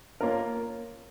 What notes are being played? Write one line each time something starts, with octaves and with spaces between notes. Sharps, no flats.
A#3 C#4 F4 A#4